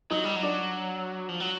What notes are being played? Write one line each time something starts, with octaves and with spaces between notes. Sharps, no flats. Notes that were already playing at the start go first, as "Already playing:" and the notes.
F#3 D#4 D#5
G3
F#3
D4 D5
F3
F#3